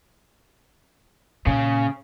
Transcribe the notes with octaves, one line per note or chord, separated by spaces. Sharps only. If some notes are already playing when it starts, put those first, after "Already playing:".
A#2 C#3